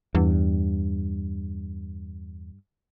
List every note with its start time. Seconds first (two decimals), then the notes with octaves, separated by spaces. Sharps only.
0.15 E2 G2